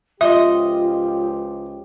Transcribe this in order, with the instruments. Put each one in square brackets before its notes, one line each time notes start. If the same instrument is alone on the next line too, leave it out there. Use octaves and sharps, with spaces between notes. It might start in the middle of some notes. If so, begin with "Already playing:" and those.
[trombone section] C#2 F3 G4 [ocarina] F4 [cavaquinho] D#5 C6 D#6 [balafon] E5